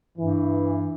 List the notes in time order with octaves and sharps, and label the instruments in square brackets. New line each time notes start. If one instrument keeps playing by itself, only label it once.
[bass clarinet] G2 [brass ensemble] E3